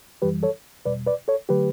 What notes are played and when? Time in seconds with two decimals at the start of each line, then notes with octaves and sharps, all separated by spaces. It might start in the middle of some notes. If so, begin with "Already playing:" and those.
0.22 F#2 E3 G3 G4 B4
0.43 A4 C#5
0.85 E2 B2 G3 B4 D5
1.07 B4 D5
1.28 A4 C#5
1.49 D3 F#3 A3 G4 B4